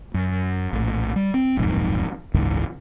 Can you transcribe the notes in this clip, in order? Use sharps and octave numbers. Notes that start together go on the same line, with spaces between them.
F#2
A#1 A2
G3
C4
D#1 B1 F2 G#2
F#1 C#2 G#2 E3